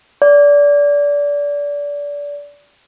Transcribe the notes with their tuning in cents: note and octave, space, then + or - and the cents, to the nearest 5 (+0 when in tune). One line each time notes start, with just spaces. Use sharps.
D5 -25